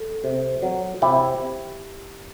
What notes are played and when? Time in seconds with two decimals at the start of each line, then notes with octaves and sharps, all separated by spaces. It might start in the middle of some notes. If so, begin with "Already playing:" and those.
Already playing: A4
0.24 C3
0.62 F#3
1.02 C3 E4 G4